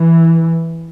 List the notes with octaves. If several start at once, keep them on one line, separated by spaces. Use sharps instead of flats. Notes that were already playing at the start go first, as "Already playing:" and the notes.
Already playing: E3